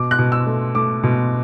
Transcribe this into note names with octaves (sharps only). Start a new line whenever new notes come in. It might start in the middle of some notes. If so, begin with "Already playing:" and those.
Already playing: B2 D6
F#6
B2
E6
A3
A3 D6
B2